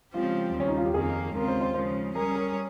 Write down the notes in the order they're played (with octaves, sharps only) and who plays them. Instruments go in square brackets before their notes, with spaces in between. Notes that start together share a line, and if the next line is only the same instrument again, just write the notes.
[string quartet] C#3 F3 G#3 C4 G4 [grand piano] F4
[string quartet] D#2 C#3 G3
[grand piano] C#4
D#4
F4
G4
[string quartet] F2 D#3 A#3 [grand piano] G#4
[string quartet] D#2 C#3 G#3 C4 F4 [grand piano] A#4
[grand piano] C5
C5
[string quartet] C#3 F3 G#3 [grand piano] C5
[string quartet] G3 C#4 G#4 C#5 [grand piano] A#4
[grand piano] A#4